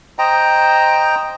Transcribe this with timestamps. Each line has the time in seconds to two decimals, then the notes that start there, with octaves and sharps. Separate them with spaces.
0.19 C5 D#5 G5 A#5